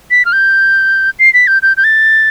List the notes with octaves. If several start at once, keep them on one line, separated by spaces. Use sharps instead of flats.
B6
F6
G6
C7
B6
G6
G6
G6
A6